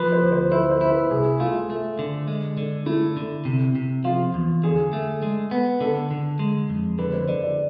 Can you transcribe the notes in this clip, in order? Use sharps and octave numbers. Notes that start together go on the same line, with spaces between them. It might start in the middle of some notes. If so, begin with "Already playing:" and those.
Already playing: F3 B4
C5
D2
C5
E4 C5
C5
E4
B4
C2 G#4
A3 F4
A3
D3
G#3
D3
A3 E4
D3
C3
C3
F3 F4
E2
D3 G#4
A3
G#3
B3
D3 A4
D3
G#3
F2
D3 B4
C5
D3 D5
D5